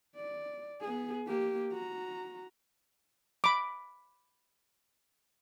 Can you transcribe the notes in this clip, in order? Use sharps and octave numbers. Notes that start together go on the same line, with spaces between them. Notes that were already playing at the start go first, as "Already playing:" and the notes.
D5
B3 G#4
A#3 G4
F#4 A#5
B5 D6